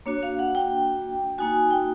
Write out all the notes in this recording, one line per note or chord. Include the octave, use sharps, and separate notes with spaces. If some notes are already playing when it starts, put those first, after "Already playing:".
A#3 D4 F#4 C#5
F5
F#5
G5
A#3 D#4 F#4 G#5
G5